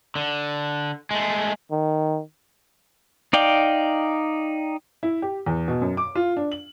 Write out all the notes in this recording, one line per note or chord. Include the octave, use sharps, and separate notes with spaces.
D3
G#3 A3
D#3
D#4 D5 F5 G5
E4
G4
E2
B2
F#2
D6
F4
D4
F#7